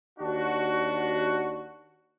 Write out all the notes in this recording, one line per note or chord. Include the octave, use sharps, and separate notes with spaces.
D#2 D4 F#4